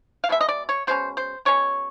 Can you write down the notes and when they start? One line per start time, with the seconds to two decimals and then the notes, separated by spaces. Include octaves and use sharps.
0.24 F5
0.29 B2 G#3 C#4 E5
0.41 D#5
0.49 D5
0.69 C#5
0.87 B2 G#3 C#4 C5
1.17 C5
1.45 B2 G#3 C#4 C#5